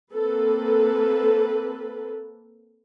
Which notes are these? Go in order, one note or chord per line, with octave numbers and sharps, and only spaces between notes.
A#3 C4 A4 B4